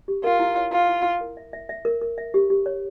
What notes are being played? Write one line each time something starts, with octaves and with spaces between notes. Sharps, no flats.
G4
F4 A#4
E4
C#5
E4 F4
E4
E4
A#4
E5
E5
E5
A#4
A#4
E5
G4
G4
C#5